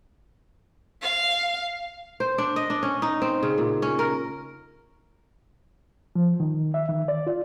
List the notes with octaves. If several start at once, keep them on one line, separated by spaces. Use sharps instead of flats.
F5
C5
D4
D#5
D4
C#4
D#4
C4
C#3
A#2
C#4
A#4
F3
D#3
E5
D#3
D5
F4